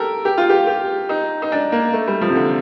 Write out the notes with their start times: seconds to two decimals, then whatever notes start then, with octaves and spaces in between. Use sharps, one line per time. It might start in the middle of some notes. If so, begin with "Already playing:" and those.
Already playing: G4 A4 A#4
0.25 G4
0.38 F4
0.50 G4
0.67 G4
1.09 D#4
1.42 D#4
1.52 D4
1.72 A#3
1.93 A3
2.08 G3
2.21 F3
2.29 C3
2.35 D3